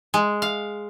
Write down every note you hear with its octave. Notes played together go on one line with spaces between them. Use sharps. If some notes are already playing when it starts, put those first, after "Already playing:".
G#3
F5